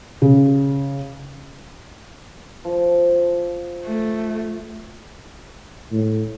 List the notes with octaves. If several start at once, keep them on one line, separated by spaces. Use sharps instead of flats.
C#3
F3
A3
A2